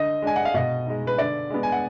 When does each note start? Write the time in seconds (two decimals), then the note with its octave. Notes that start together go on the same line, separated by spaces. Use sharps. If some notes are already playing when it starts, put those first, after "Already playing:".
Already playing: D3 D#5
0.22 G#3 D4 G#5
0.36 F#5
0.45 F5
0.54 B2 D#5
0.86 G#3 D#4
1.07 B4
1.18 D3 D5
1.50 G#3 B3
1.63 G#5
1.72 F#5